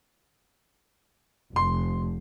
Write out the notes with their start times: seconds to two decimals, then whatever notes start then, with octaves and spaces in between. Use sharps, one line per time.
1.56 F1 C6